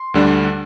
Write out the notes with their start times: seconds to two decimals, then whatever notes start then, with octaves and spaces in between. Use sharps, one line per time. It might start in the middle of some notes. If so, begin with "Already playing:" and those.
Already playing: C6
0.14 D2 D3 G3 D4